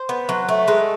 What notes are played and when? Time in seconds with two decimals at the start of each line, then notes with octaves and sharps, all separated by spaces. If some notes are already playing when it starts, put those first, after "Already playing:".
Already playing: C5
0.09 B3
0.29 F#3
0.49 A3
0.68 G#3 B4